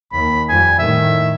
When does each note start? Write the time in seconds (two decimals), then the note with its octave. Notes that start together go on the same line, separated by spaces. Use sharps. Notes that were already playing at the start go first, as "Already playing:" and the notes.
0.12 D#2 B5
0.49 F2 F3 G3 G#5
0.79 A2 D#3 E5